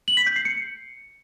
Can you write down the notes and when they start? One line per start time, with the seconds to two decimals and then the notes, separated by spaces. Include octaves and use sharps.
0.08 F#7
0.17 B6
0.26 G6
0.36 C7
0.45 C#7